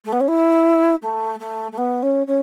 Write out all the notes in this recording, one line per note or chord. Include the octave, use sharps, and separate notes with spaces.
A3
B3
C#4
E4
A3
A3
A3
B3
C#4
C#4